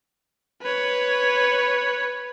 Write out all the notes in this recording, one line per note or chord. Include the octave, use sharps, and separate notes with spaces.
B4 C#5